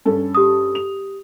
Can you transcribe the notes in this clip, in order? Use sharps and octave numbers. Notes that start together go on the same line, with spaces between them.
G2 C#4 A4
G4 D#6
F7